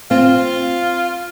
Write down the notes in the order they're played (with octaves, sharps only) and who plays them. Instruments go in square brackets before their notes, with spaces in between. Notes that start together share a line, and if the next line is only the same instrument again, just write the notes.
[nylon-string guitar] C4 [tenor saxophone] F4